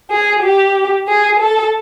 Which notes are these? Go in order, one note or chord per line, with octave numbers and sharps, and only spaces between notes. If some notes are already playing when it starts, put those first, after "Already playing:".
G#4
G4
G#4
A4